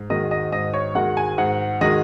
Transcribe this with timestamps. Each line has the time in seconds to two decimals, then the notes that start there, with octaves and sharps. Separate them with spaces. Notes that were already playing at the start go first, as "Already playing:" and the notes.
Already playing: G#2
0.10 D#3 G#3 F#4 A#4 D#5
0.31 D#5
0.52 G#2 D#5
0.73 C#5
0.95 D#3 G#3 F#4 A#4 F#5
1.17 G#5
1.38 G#2 F#5
1.81 D#3 G#3 F#4 A#4 D#5